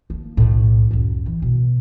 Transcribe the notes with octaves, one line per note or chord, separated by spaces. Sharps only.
F3 A#3
B1 A2
C#2 F#2
A1 E3
B2